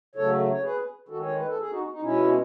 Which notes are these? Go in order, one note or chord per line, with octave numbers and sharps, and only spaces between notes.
C#3 F#3 A3 A4 C#5
C#5
G#4 B4
D#3 G#3 F#4 A4
C#5
B4
A4
G#4
D#4 F#4
D#4
B2 G#3 C#4 E4